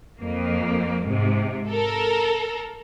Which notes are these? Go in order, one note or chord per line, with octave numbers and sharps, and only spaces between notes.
F2 A#3
G#2 C3
A4 A#4